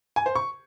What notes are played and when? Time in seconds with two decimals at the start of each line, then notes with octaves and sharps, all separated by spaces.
0.16 G#5
0.26 C5
0.35 C#6